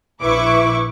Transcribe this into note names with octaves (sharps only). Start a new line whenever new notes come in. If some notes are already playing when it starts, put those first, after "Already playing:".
A#1 E4 B4 C#6 D6